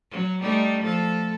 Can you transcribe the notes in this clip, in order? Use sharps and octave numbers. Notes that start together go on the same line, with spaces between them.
F#3
G3 A3 D#4
F3 A4